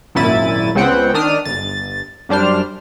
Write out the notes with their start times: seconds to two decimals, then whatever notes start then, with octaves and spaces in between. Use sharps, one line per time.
0.15 G#1 F#2 A#2 E4 A6 D#7
0.75 C#2 C#3 B3 C4 F#5 G5
1.14 D#3 D4 D#6 F6
1.45 G1 A6
2.29 F#2 G3 D4 C5 F6